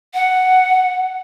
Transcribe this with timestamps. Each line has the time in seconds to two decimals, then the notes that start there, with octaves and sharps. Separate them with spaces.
0.14 F#5